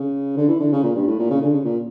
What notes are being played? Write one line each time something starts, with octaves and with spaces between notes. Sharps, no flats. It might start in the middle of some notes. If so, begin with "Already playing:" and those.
Already playing: C#3
D3
E3
D3
C#3
A#2
G2
A2
A#2
C#3
D3
C#3
A#2